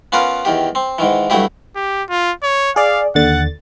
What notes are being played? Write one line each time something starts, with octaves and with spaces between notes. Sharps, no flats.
B3 C#4 F4 A#4 B4
E2 D#3 G4
C4
G#2 D#3 E3
G2 F#3 A3 E4 G4
G4
F4
C#5
G#4 D5 F5
D#2 D3 F#5 A6